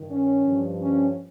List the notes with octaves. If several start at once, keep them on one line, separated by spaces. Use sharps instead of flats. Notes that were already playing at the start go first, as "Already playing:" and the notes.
Already playing: G2 D#3
C#4
G2 F3
C#4